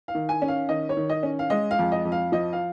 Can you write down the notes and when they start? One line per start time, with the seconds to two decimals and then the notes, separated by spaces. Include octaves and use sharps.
0.08 F5
0.15 D#3
0.29 G#5
0.42 C#4
0.48 F5
0.69 D#3 D#5
0.89 C#5
0.97 D#3
1.09 D#5
1.23 C#4
1.39 F5
1.50 G#3 D#5
1.71 F5
1.78 F2
1.92 D#5
2.05 F2
2.12 F5
2.32 F3 D#5
2.53 F5